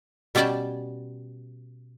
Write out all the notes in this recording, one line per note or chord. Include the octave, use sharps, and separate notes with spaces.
B2 G3 C#4 D5 G5 A5